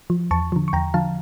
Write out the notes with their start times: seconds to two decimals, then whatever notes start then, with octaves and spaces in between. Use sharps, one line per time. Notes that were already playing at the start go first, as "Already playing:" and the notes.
0.10 F3
0.31 E2 A5 C#6
0.52 D3 F3
0.68 C#6
0.73 E2 G5 A#5
0.94 D3 F3 F5 A5